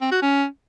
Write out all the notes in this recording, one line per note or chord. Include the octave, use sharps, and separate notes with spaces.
C4
F#4
C#4